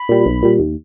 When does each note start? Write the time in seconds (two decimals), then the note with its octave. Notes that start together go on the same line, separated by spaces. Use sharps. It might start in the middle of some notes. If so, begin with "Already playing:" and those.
Already playing: B5
0.09 A#2 G3
0.26 B1
0.43 A#2 G3
0.59 D#2